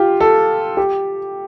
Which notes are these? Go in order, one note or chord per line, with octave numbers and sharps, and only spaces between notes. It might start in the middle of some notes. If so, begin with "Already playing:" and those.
Already playing: F4 G4
A4
G4